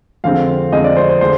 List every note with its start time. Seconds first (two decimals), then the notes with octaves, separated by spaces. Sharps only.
0.24 F2 D3 G#3 C4 F5
0.72 F2 D3 G#3 C4 D#5
0.84 D5
0.97 C5
1.09 C5
1.21 D3 G#3 D4 C5